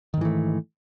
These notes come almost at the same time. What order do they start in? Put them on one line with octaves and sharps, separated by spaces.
D#3 G#2 E3 A3